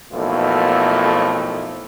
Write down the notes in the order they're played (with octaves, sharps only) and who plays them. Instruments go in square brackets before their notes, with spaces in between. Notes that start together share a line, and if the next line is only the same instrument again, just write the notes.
[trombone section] B1 F2 B2 A3 A#3 E4